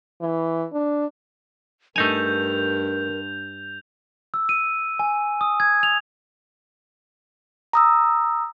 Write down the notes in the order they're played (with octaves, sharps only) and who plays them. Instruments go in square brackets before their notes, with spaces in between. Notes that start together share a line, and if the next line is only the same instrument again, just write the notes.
[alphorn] E3
D4
[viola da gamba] G2 [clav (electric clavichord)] A3 D#4 G#5 [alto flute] A#4 [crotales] G6 F7
[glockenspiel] E6
D#7
G#5
D#6
G#6
F7
[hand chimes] A#5 D#6 E6